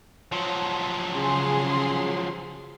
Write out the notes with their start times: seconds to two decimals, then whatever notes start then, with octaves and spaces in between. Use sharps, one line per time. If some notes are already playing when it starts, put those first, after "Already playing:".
0.32 F3 F#3
1.12 C#3 G#4 C6